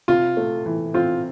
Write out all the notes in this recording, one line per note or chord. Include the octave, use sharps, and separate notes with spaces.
C3 F4
A3
E3
C4 F4